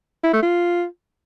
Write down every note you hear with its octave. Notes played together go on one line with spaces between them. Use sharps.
E4
A3
F4